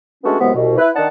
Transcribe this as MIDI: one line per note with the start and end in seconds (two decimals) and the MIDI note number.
0.24 0.35 56
0.24 0.35 57
0.24 0.35 59
0.24 0.35 61
0.24 0.35 62
0.24 0.35 66
0.40 0.50 42
0.40 0.50 48
0.40 0.50 52
0.40 0.50 56
0.40 0.50 59
0.55 0.77 36
0.55 0.77 47
0.78 0.88 64
0.78 0.88 71
0.95 1.06 51
0.95 1.06 62
0.95 1.06 63
0.95 1.06 78
0.95 1.06 81